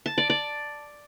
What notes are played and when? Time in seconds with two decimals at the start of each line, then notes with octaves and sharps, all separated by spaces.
0.06 A5
0.18 D5
0.30 D5